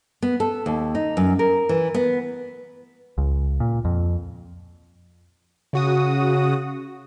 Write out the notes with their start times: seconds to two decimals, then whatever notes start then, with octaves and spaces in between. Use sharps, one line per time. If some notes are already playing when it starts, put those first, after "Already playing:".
0.22 B3
0.40 A4
0.66 D#2
0.95 D#4
1.17 F#2
1.39 A#4
1.69 E3
1.94 B3
3.18 C#2
3.60 A#2
3.85 F2
5.73 C#3 F#4 D#6